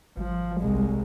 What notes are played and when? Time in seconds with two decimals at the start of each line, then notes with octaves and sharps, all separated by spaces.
0.17 G#1 F3
0.60 C2 G#3